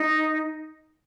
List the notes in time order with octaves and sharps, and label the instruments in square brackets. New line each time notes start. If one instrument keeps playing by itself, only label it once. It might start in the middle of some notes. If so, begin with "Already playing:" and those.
Already playing: [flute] D#4